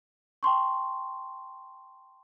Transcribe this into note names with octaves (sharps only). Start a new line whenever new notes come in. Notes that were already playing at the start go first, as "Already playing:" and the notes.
G5 A5 C6 C#6